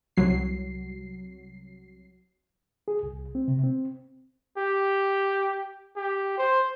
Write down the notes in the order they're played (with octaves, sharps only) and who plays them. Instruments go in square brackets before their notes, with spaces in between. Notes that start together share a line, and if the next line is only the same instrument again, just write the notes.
[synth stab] C2 F#3 C7
[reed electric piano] G#4
C2
C4
C3
C4
[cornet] G4
G4
C5